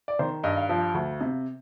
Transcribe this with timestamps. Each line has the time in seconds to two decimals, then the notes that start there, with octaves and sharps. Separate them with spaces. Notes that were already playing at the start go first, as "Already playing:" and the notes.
0.08 D5
0.19 D#3 C5
0.44 G2 D#5
0.57 F5
0.69 F3
0.94 D2
1.21 C3